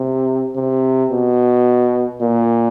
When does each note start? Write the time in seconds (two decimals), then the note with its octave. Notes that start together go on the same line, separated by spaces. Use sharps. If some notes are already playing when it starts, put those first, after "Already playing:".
Already playing: C3
0.56 C3
1.11 B2
2.22 A#2